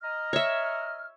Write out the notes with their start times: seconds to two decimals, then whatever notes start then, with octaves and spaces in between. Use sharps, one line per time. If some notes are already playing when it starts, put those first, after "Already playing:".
0.03 D#5 A#5 F6
0.33 C#5 E5